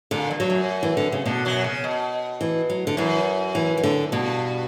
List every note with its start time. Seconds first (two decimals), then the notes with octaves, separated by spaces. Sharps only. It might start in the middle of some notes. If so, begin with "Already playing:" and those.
0.11 A#2 D3
0.31 G2
0.40 F#3
0.50 F#2
0.83 E3
0.97 D3
1.12 C#3
1.26 B2 D3
1.45 F#2 F#3
1.64 C#3
1.84 B2
2.41 E3
2.70 F#3
2.87 D3
2.97 F#2 E3
3.55 E3
3.77 E3
3.83 D3
4.12 G2 B2